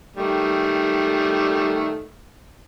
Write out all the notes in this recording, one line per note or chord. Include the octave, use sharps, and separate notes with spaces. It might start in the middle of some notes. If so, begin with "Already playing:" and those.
D#3 G3 A3